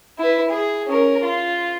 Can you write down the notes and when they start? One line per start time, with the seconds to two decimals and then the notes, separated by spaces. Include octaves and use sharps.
0.19 E4 B4
0.50 G#4
0.87 C#4 A#4
1.24 F4